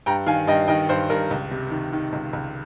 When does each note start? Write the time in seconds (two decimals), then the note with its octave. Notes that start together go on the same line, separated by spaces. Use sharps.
0.06 G2 G5 A#5
0.27 D#3 F5 G#5
0.47 G2 D#5 G5
0.68 D#3 D#5 G5
0.89 G2 C5
1.10 G2 A#4
1.31 C#2
1.51 C3
1.71 D#3
1.93 D#3
2.12 C#2
2.33 C#2